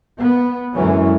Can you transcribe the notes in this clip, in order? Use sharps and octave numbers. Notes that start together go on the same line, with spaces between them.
B3
F#2 D3 E3 F#3 G#3 C#4